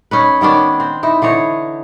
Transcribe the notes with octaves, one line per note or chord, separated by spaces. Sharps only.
C#4 D#4 B4
D#3 B3 C#4 D4
C4
D#4 E4
D3 E3 D#4 C#5